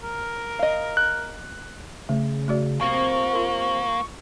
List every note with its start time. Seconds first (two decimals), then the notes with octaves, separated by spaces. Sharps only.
0.02 A#4
0.59 D#5 F5
0.97 F#6
2.09 C#3 A3
2.48 A3 F#4 D5
2.81 C3 F3 A#3 C4 C#6
3.33 F4 A#4